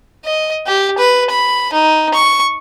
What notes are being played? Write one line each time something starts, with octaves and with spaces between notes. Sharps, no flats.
D#5
G4
B4
B5
D#4
C#6